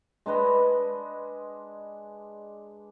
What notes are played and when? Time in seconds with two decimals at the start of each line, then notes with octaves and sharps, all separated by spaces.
0.26 G#3 D4 B4 D#5